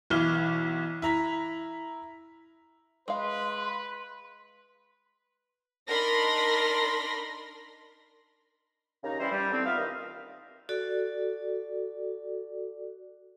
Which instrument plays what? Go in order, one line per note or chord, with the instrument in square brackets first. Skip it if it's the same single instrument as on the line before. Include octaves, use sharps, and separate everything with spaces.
[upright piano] B1 E3 E4 F6 G7
E4 A#5 B6
[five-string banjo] G#3 F5 [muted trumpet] B4 [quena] C6
[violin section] D4 D#4 A#4 B5 C6 A#6
[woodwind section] D#2 C#3 D#4 A#5
E3 G3 C#4 E4 C5
G3
A2 D3 C4
B3 F4 E5 F5
D#2 D#3 D#5
[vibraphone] F#4 A4 D5